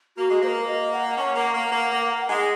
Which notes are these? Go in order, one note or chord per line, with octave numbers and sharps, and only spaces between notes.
A#3 F#4
G#3
A#3 C5
A#4
D#5
F#5
C#4 F#5 A#5
A#3
A#3
A#3
A#3
G#3